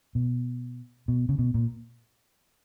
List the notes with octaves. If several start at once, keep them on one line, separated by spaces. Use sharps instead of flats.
B2
B2
C#3
B2
A#2